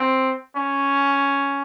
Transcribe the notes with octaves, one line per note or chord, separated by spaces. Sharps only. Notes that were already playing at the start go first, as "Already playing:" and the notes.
Already playing: C4
C#4